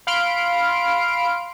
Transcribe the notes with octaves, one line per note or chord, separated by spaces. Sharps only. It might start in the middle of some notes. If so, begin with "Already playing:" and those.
F5 B5 C6 F6 D7